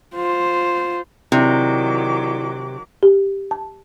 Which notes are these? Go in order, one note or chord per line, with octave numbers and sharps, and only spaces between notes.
F4 C5
C3 D#3 F#3 E4 D5 D6
G4
A5